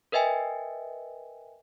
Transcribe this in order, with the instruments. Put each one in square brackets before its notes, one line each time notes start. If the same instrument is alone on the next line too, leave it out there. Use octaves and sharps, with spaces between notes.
[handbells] A#4 B4 D#5 E5 G5 G#5